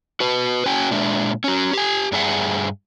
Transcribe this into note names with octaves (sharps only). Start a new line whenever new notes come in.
F#4 B4
C#4 F#4 G5 G#5
A#2 G#3 D4 E5
C#4 F#4
G4 G#5
G2 D4 G#4 E5 F#5